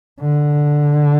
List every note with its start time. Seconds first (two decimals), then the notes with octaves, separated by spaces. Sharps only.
0.21 D3